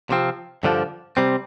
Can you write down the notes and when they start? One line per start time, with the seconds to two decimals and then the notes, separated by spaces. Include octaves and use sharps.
0.10 C3 F3 C4
0.63 G2 D3 F3 D4
1.17 C3 G3 C4